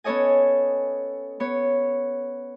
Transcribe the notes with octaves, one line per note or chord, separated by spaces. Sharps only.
B3 C#4 A4 C#5 D#5 G#5
B3 C#5